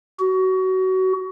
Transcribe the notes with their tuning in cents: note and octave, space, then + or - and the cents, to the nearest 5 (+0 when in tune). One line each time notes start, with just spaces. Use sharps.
F#4 +25